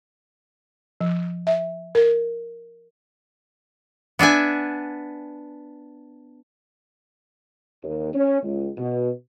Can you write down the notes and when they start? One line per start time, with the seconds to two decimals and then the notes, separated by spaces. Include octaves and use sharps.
1.01 F3
1.47 E5
1.95 A#4
4.19 B3 D4 E5 G#5
7.83 D#2
8.13 C#4
8.43 C#2
8.77 B2